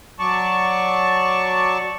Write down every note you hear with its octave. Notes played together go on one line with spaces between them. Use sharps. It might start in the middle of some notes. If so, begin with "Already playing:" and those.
F#3 D5 A5 C#6